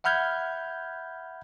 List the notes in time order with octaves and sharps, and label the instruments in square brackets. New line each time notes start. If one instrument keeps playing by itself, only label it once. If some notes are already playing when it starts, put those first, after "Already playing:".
[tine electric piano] E5 F#5 B5 F6 G6 G#6